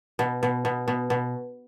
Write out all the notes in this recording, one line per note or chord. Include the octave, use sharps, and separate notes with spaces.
B2
B2
B2
B2
B2